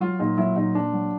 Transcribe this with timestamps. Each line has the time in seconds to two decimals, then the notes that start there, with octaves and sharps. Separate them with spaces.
0.01 F#3 F4
0.20 A#2 D#4
0.37 F#3 E4
0.56 A#2 D#4
0.75 A#2 D4
0.93 F#3